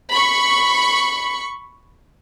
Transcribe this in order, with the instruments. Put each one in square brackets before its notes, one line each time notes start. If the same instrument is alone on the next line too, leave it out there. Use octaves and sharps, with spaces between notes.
[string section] B5 C#6